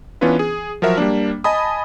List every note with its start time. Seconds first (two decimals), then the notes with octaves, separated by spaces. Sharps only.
0.21 E3 B3 C#4 D4 F4 B4
0.39 G#4
0.82 F3 F#3 F#4 A#4 E5
0.97 G3 A#3 D4
1.44 D#5 G#5 A5 B5 D#6